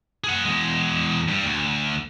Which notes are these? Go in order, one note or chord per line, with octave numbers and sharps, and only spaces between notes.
G#4 F#5
E2 G#3
G2 G3
D2